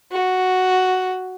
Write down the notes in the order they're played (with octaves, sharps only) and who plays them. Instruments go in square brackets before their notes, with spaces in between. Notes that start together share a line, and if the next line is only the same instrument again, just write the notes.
[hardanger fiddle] F#4